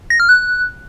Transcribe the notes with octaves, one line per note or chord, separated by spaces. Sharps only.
A#6
F6
F#6